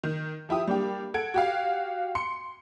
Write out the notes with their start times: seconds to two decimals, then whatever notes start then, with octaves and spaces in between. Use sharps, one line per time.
0.04 D#3
0.49 F3 E4 G4 D#6
0.67 G3 A#3 D4 G4
1.14 A4 F#5 G#6 D7
1.34 F#4 G4 F5
2.15 C6 C#7